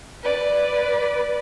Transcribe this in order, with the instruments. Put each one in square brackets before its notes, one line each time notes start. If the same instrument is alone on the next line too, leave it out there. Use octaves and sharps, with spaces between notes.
[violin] B4 D5